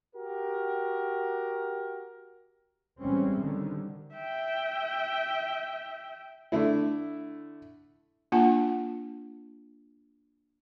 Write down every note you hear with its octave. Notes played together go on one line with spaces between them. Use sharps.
F#4 G4 A#4
A1 E3 G3 G#3 C4 C#4
D3 D#3 G3
E5 G5
D3 A3 E4
A#3 D4 F4 F#5 A5